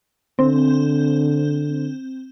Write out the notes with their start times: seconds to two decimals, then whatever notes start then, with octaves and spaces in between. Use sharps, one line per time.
0.39 D3 C4